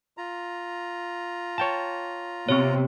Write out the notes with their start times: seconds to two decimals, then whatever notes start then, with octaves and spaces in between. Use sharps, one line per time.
0.18 F4 A#5
1.58 C#5 G5 A5
2.49 C3 B3 G4 C#5